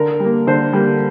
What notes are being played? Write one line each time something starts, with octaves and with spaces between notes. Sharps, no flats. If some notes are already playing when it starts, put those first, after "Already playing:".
Already playing: D3 A#4
G3
A#3
D3 C5
G3 A#3